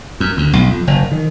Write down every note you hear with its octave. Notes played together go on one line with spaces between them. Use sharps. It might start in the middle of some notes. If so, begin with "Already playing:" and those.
F#2
D2
B1
F2
F#1
D#3